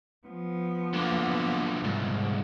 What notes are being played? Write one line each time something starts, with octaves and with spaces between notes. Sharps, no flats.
F3 B3
B1 D3 A#3
C2 G#2